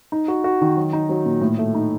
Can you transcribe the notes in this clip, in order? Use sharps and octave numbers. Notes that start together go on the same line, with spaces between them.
D#4
F#4
F#4
D#3
F#3
D#4
F#3
A#2
A2
A3
D#4